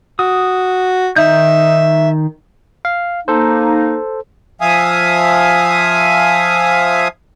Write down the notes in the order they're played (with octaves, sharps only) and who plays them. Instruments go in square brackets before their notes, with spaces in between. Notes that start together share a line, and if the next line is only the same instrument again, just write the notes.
[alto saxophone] F#4 [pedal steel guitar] D#6
[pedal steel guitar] D#3 G6 [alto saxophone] D#4 [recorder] E5
[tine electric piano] F5
[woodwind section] A#3 D#4 [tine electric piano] A4 C5
[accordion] F3 E5 F5 G#5 D#6